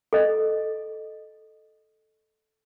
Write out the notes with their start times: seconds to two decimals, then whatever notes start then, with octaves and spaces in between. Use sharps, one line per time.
0.13 A4 D#5